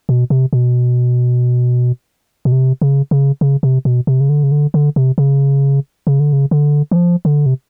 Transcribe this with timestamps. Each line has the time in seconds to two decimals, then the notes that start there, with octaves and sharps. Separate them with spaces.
0.09 B2
0.30 C3
0.53 B2
2.45 B2
2.52 C3
2.82 C#3
3.11 C#3
3.41 C#3
3.63 C3
3.85 B2
4.07 C3
4.20 C#3
4.29 D3
4.43 C#3
4.51 D3
4.74 D3
4.96 C3
5.18 C#3
6.07 C#3
6.20 D3
6.33 C#3
6.51 D3
6.91 E3
6.96 F3
7.25 D3
7.46 C3